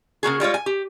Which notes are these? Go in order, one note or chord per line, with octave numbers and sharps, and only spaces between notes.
C#3 A#3 F#4 G#4
G3 G#3 F4 C#5
G#5
G4